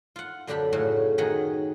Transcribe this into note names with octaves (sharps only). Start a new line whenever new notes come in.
F4 F#5
F#2 D3 D4 G4 B5
A2 C#3 F#4
D#3 F#4 G#4 D#5 F#5